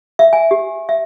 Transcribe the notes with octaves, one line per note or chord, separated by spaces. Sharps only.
E5
G#5
G4
E5